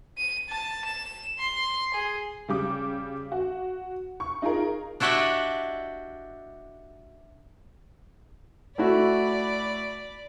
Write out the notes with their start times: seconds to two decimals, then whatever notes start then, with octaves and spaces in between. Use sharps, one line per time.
0.17 D#7
0.48 A5
0.85 E7
1.38 C6
1.94 G#4
2.48 C#3 G3 D6
3.32 F#4
4.20 C#6
4.42 D#4 F4 G#4 A#4
5.00 D4 E4 F#4 G4 D#5 E5
8.78 A3 E4 F#4 D5 B5